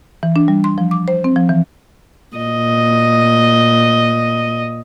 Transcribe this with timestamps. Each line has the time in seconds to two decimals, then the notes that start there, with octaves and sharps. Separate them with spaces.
0.23 E3
0.36 D4
0.48 G3
0.64 C6
0.78 F3
0.91 D6
1.08 C5
1.24 C4
1.36 F3
1.49 E3
2.36 A#2 D#5